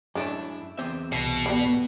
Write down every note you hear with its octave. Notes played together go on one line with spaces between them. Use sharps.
F#2 G#3 A3 C#4 D4 E4
E2 C4 E5
C2 B2 E4
G3 A3 B3 E4